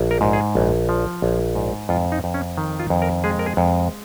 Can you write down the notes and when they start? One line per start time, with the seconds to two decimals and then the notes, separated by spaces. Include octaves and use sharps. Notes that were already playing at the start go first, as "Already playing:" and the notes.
Already playing: A#1
0.11 A#4
0.21 G#2
0.33 G#4
0.55 A#1
0.89 F3
1.22 A#1
1.55 G#2
1.89 F2 F4
2.12 D#4
2.24 F2
2.34 C#4
2.58 D#3
2.80 F4
2.90 F2
3.02 A#4
3.24 G#3 G#4
3.39 A#4
3.46 G#4
3.57 F2